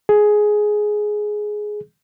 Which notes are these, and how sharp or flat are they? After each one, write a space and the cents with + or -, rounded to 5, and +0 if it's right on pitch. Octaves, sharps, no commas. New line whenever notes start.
G#4 +10